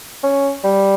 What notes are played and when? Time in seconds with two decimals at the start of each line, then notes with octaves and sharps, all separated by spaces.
0.23 C#4
0.64 G3